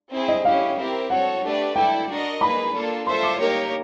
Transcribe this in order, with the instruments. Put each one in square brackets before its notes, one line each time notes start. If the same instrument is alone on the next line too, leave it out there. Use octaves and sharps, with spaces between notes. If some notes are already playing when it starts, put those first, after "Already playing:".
[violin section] C4 E4 G#4
[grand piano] D#5
[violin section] C#4 E4 G4 [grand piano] F5
[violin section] C4 E4 G4 A#4
[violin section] F#4 A4 C#5 [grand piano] F#5
[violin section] A3 D4 G4 B4 D5
[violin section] E4 A4 D5 [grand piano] G5
[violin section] D4 F#4 A#4 D#5
[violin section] A#3 D#4 G#4 B4 [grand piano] B5
[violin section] A#3 D4 F4 A4
[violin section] F4 A4 C5 E5 [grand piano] C6
[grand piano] D6
[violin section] A#3 D#4 G4 A#4 C#5